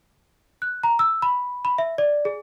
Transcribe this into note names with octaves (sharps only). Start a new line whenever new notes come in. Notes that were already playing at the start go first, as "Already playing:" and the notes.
F#6
A#5
E6
B5
B5
E5
D5
G#4